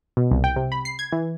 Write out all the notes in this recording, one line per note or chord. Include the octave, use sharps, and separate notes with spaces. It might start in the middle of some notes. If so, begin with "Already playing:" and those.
B2
C2
G5
C3
B5
C7
G#6
E3